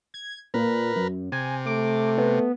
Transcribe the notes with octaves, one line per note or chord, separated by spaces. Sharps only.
G#6
A#2 A#4 B4
F#2
C3 G#5
A3 D6
B3